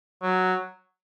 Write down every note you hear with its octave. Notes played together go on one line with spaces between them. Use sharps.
F#3